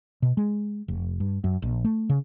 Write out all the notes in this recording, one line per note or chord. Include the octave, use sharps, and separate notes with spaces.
B2
G#3
F1
G2
F#2
A#1
A3
C#3